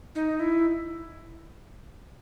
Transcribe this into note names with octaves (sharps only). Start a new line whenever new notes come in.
D#4
E4